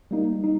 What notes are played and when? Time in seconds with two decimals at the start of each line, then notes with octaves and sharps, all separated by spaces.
0.11 G3 A#3 D#4
0.44 G3 D#4